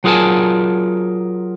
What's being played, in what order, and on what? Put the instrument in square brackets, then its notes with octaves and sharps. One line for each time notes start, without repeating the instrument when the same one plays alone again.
[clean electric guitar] F#3 F4 G#4 A#4 G#5 A5